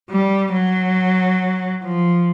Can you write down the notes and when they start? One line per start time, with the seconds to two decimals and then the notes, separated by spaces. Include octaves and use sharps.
0.10 G3
0.53 F#3
1.83 F3